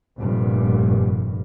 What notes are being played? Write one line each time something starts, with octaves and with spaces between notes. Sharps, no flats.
F1 G2 A#2